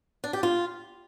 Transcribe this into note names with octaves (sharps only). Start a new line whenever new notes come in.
D4
G4
F4